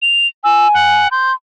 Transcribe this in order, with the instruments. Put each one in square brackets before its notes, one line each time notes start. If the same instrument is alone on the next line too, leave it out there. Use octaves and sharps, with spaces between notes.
[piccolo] F7
[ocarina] G#5 [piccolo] E6
[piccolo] F#5
[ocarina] C6 [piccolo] G6